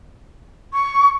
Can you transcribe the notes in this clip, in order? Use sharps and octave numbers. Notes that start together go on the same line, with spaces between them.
C#6